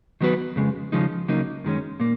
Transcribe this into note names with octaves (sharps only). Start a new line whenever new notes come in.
D#3 F#3 B3 F#4 B4
F2 C#3 G#3
D#2 C#3 F3 G#3 D#4
C#2 C#3 F#3 A#3 D#4
F#2 D#3 G#3 C#4
A#2 A#3